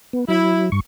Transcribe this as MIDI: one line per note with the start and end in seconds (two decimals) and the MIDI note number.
0.13 0.25 59
0.28 0.70 54
0.28 0.64 64
0.72 0.80 43
0.72 0.80 85